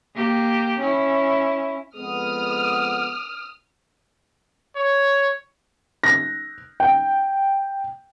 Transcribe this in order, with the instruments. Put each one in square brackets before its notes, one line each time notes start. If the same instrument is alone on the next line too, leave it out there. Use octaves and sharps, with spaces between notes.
[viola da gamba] A#3 G4
C#4 E4
[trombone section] F2 G#3 B3 [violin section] D#6 F6
[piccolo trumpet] C#5
[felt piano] A#6
G5